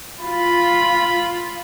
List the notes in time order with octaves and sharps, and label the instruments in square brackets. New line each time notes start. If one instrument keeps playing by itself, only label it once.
[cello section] F4 [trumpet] B5